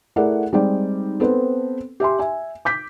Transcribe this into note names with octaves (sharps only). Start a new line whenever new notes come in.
A3 E4 G#4 A#4 D5 F#5
G3 G#3 C4 D#4 D5 G5
B3 C4 A4 B4 C5
G4 E5 G#5 C6
E5 G#5
D6 G6 B6